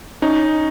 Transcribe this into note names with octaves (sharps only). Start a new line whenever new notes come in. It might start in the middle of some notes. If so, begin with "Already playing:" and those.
C#4 D#4